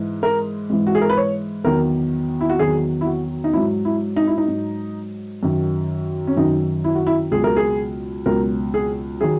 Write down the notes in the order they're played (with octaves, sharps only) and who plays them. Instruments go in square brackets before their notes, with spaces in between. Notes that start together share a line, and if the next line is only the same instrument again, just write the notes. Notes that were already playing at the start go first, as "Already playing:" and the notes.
Already playing: [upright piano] G#2 E3 G#3
A#4
G#2 E3 G#3
F#4
G#4
A#4
B4
C#5
E2 D#3 F#3 A#4
E4
F#4
E2 D#3 F#3 G#4
E4
F#4
D#4
G#2 F#3 E4
E4
D#4
E4
D#4
G#2 F#3
F#2 D#3 F#3
C#4
F#2 D#3 F#3 D#4
E4
F#4
E4
C#2 B2 F#3 G#4
A#4
G#4
C#2 B2 F#3 A#4
G#4
D#3 F#3 G#4